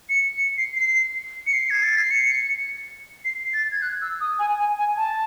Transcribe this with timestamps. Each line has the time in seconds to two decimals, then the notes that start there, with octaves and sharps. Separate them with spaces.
0.10 C#7
0.38 C#7
0.58 C7
0.76 C7
1.47 C#7
1.53 C7
1.70 G#6
1.83 A6
1.97 C7
2.11 C#7
3.25 C7
3.54 A6
3.72 G#6
3.82 F#6
4.02 E6
4.21 D#6
4.39 G#5
4.59 G#5
4.78 G#5
4.97 A5